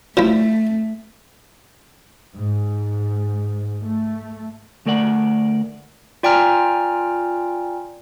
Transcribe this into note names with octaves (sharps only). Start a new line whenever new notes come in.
F3 A3 E4
G#2
A3
D2 A3 A#4 D5 F#5
F4 D5 G5 G#5 A#5 F6